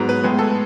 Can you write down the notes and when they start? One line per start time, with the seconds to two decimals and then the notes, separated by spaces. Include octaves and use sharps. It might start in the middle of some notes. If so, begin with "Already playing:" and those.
Already playing: G#2 F#3 B3
0.09 B4
0.23 A2 G#3 B3
0.39 A4